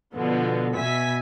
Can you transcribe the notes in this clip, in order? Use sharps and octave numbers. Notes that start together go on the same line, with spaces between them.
B2 D3 F3 B3
B2 E5 G#5 B6